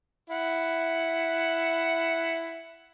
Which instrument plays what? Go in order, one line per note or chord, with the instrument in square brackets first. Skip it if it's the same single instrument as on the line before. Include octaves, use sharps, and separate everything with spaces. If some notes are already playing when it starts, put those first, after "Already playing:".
[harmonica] E4 F#5